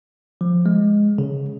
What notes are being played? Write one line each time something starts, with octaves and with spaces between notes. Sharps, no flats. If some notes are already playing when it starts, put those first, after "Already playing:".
F3
G#3
C#3